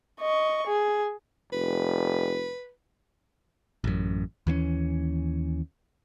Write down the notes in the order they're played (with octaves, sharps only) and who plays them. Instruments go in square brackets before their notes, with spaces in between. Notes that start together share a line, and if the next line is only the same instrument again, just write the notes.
[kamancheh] D#5 C#6
G#4
[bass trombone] F1 [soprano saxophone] B4
[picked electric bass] A1 F#2
D#2 E3 B3 C#4